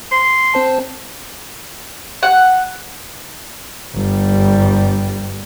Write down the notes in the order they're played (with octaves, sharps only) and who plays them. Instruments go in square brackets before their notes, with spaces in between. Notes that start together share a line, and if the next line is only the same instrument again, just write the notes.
[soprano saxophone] C6
[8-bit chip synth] C4 C5 A5
[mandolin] F#5
[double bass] G1 G3